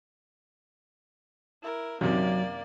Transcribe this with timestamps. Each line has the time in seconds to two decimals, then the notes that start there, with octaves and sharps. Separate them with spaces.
1.63 E4 A#4
2.01 F#2 C3 D#3 F#3 A#3 D5